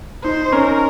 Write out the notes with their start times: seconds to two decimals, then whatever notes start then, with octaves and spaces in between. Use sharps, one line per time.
0.24 D#4 C5
0.52 C#4 A#4